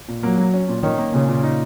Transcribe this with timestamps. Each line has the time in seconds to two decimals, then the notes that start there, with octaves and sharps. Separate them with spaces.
0.08 A#2
0.23 F#3 A#3
0.38 F#3
0.54 C#4
0.68 A#2
0.83 D#3 C#4
0.99 A#3
1.13 A#2 C#3
1.28 A#2
1.44 D#4